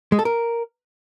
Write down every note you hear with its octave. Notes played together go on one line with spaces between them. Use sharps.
G#3
A4
A#4